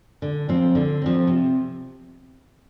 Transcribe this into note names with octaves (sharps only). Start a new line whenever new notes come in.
D3
F3 C4
D3
F3 C4
C3